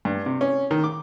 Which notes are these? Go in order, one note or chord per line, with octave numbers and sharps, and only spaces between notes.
G2
C3
C#4
D#3
D6